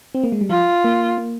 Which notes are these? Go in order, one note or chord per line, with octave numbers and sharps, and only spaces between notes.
C4
A#3
G#3
G3
F3 F4
A#3
A#3